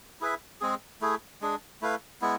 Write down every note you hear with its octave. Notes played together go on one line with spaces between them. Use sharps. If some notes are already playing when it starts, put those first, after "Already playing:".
E4 G#4 B4 E5
G#3 C4 G#4
A3 E4 G#4
G#3 D4 G#4
A3 E4 B4 F5
G#3 B3 E4